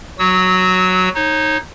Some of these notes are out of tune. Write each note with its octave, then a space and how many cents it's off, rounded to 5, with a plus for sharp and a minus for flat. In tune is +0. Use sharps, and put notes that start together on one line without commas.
F#3 +0 F#4 +0 E6 -40
D#4 +0 C#5 -30